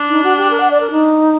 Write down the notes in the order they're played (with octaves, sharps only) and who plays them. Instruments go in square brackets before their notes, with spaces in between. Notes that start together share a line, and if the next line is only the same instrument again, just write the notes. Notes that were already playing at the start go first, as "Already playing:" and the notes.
Already playing: [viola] D4
[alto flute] D#4
F#4
G4
A#4
F#5
D5
A#4
D#4